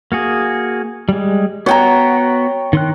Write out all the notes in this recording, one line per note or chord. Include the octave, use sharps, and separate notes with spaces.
A#3 F#4 G#4
G3 G#3
B3 F#4 C#5 G5 A#5
D#3 C6 F#6